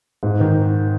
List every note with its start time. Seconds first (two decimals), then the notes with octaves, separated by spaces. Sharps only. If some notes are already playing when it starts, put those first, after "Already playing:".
0.23 G#2
0.40 D#3